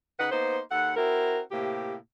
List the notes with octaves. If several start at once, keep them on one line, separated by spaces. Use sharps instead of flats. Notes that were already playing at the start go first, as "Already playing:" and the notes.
C#3 D#4 B4 F#5
A#3 B3 D#4 C5
D#2 A4 F#5
C4 E4 F#4 A#4
A2 C3 A#3 G4